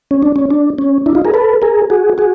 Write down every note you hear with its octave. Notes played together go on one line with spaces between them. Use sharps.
C#4
D4
C#4
D4
C#4
D4 E4
D#4 F4
G#4 A#4
A4 B4
G#4 A#4
F#4 G#4
F#4 G#4